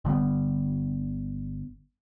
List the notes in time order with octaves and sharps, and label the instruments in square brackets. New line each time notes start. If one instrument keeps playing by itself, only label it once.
[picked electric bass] G1 D3 G3 B3